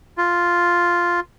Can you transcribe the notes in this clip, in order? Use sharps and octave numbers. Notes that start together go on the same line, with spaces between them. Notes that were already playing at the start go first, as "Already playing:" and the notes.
F4